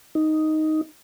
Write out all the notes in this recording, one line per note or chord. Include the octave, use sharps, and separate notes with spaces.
D#4